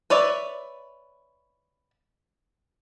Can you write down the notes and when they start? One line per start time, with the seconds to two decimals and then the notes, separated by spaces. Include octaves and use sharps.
0.10 B4 C#5 D5 E5